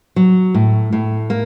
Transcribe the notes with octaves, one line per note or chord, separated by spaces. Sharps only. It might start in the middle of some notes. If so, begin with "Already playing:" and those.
F#3
A2
A2
A#3